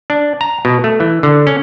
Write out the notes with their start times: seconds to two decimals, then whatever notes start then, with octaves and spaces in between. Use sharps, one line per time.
0.10 D4
0.41 A#5
0.65 B2
0.84 A3
1.00 E3
1.23 D3
1.47 C#4